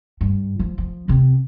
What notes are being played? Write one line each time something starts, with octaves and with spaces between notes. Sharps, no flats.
G2
F3
F3
C3 C4